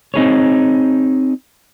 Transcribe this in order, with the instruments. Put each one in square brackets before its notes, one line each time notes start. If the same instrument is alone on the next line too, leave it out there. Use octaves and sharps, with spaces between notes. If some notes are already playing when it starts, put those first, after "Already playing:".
[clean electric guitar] C4 D#4 G#4 C#5